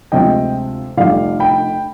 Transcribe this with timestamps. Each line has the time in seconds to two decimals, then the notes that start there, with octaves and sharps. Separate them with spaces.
0.12 D2 C3 F3 G#3 D#5 G5
0.97 F1 F2 D3 G3 D5 F5
1.40 G5 B5